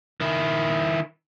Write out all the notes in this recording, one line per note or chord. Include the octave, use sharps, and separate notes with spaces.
D#3 E4